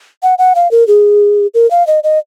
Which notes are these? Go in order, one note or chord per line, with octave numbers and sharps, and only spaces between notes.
F#5
F#5
F5
A#4
G#4
A#4
F5
D#5
D#5